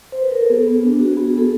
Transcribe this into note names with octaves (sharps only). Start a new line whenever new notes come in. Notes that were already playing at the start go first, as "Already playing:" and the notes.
C5
B4
A#4
A4
B3 G#4
B3
D4
F#4 G#4
G#4
B3
G#4
B3 A4